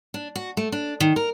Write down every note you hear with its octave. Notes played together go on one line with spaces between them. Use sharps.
D4
F#4
A3
D4
D#3
A#4